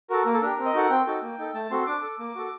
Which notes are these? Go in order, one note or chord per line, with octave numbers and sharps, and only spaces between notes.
F#4 A4 A#4
A#3 A#4
A4
D4 G4 A#4
C4
D#5
D#4 F#4 A4 F#5
C4 G5
D#4 F#4 A4
A#3
D#4 A4
A3 A5
C4 F#4 A4 C6
D4 D6
A4
A#3
F#4 A4